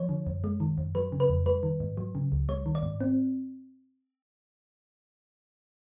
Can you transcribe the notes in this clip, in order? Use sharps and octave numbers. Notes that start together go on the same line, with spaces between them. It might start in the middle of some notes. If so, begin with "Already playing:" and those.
Already playing: F3 C#5
D3
F#2
G#3
D#3
F#2
F#3 B4
C#3
B4
F2
G3 B4
D#3
G#2
F#3
C#3
C#2
G3 C#5
D#3
D5
G#2
C4